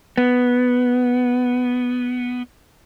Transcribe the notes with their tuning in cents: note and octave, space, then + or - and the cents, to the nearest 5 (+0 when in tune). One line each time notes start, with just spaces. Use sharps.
B3 +0